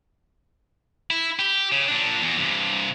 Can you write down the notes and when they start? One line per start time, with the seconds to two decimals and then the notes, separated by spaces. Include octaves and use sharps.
1.10 E4
1.39 G4
1.72 C#3
1.88 A#2 D4
2.23 E2
2.38 G2 C3